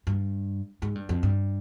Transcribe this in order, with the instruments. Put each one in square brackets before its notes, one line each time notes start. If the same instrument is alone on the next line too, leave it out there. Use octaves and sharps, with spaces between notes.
[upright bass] G2
G#2
G2
F2
G2